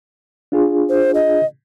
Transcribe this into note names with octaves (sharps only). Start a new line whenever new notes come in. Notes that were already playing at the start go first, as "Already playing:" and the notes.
D4 F4 G#4
C5
D#5